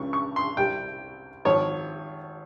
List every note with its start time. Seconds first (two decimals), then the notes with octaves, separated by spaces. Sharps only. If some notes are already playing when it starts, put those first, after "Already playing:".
Already playing: C#2 C#3 F3 C#6
0.13 C#6
0.36 C6
0.57 C2 C3 G3 G5
1.45 G#1 G#2 F3 C#5